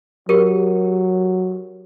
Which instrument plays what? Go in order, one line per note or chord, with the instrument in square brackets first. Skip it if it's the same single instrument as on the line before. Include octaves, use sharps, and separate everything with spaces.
[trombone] F#3 [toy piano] G4 A#4